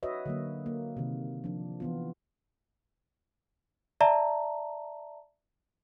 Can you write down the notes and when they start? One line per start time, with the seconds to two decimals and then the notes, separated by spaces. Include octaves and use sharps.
0.03 F#4 B4 C#5 D#5 E5
0.26 D3 F#3 A#3
0.66 A#3
0.97 C3 D#3
1.44 F3 D4
1.80 E3 B3 F4
4.01 D5 E5 A5 A#5